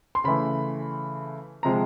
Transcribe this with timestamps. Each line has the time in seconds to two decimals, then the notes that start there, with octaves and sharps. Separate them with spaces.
0.15 C6
0.24 C#3 E3 A3 B5
1.63 C3 F3 G#3 A#5